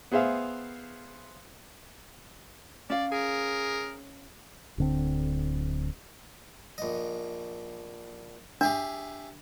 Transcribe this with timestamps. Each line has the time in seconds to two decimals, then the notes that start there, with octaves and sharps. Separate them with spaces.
0.12 B3 G#4 C5 E5 F5
2.90 C#4 D5 F5
3.12 G#4 A#4
4.78 D1 D3 C4
6.78 A#1 D#5
8.61 D4 G4 G#4 E5